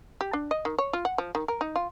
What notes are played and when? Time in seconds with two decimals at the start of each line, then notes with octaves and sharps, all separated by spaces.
0.21 G4
0.33 D4
0.51 D#5
0.65 D#3
0.78 C#5
0.93 F4
1.05 F#5
1.18 F3
1.35 D#3
1.48 A#4
1.61 D#4
1.76 F4